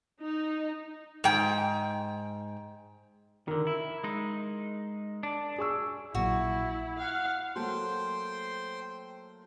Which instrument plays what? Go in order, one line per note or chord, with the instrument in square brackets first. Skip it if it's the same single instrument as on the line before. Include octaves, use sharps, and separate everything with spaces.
[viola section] D#4
[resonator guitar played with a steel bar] G#2 G5
[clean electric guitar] D3 D#3 [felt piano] A#4
[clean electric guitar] E4
G#3 D#4
D4
[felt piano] G#4 C#6 E6
[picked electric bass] A#1 A#2 F#3 [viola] E4 [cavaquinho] F#4
[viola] F5 [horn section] F#5
[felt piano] F#3 A3 A#3 [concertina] C5 G5 C6